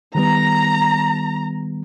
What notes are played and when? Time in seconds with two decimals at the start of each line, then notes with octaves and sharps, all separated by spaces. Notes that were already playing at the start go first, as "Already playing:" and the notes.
0.15 D#3 G3 B3 A#5